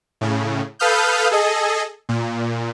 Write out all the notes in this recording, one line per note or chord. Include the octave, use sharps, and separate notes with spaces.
A2 C#3
A4 B4 F5 D#6 F6 G6
G#4 A4 D#5
A#2